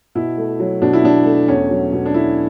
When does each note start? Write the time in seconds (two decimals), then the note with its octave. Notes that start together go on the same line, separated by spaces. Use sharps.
0.15 B2 E4
0.38 A3
0.60 F#3
0.82 B2 D4
0.93 E4
1.04 B2 D4
1.26 A3
1.48 E2 C#4
1.70 F#3
1.92 B2
2.05 D4
2.14 A3 E4